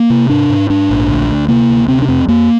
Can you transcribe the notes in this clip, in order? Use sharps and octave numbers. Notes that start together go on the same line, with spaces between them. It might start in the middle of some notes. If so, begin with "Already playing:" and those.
Already playing: A#3
C3
G#2 D4
G#2
G#2 D4
A#1
D2
D2
C3 A#3
D2
C3 C4
D4
F2 C4
F2 A#3